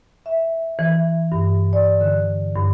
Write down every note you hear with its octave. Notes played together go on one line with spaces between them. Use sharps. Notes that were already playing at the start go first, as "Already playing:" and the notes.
E5
E3
G2
D5
D3
G2